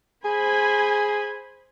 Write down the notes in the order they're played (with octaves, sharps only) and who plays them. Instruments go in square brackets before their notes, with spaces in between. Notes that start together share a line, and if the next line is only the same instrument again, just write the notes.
[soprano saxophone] G#4 [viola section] C5 G#5 B5